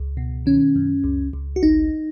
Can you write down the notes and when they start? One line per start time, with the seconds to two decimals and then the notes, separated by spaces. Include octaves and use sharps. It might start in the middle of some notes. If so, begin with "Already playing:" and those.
Already playing: C#2
0.17 B2
0.46 D#3 C#4
0.76 F#2
1.04 C#2
1.33 C#2
1.56 F#4
1.63 G#1 D#4